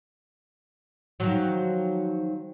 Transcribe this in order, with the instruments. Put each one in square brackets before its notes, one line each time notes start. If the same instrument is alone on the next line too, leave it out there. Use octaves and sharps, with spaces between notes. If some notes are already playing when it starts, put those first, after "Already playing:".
[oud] D#3 F3 F#3